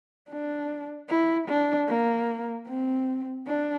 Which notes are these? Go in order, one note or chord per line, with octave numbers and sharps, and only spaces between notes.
D4
E4
D4
A#3
C4
D4